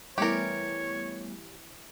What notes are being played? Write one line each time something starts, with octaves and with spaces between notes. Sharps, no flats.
E3 G3 A3 B3 G4 A#4 C#5 D5